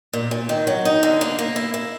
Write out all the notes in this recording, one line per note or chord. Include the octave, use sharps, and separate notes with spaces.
A#2
A#2
D#3
F#3
D#4
D3
A#3
A#3
E4
E4